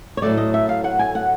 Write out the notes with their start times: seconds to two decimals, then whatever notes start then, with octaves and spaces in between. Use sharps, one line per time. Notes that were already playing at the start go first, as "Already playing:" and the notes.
0.17 C#5
0.22 A2 F#3 A3 D5
0.37 D#5
0.54 E5
0.69 F5
0.84 F#5
0.99 G#5
1.15 F#5